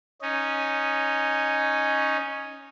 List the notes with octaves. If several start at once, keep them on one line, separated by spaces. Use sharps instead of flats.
C#4 D#4